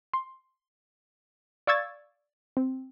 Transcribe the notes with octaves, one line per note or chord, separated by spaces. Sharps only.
C6
D5 F5 C#6 E6 G#6 A6
C4